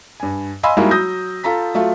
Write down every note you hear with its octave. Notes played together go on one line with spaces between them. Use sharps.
G2 G#5
D#5 F5 G#5 B5 C6 E6
G3 G#3 A#3 D#4 E4 F#4
F#3 D#6 G6 A#6
F4 A4 A#5 B6
F#3 A3 F4